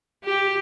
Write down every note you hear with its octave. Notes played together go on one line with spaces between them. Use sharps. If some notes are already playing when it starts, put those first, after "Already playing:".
G4